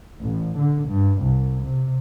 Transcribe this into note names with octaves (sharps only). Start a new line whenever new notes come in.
A1
D3
G2
C2
C3